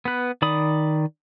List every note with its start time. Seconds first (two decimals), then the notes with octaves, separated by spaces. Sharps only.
0.05 B3 B4
0.42 D#3 D5 B5 D#6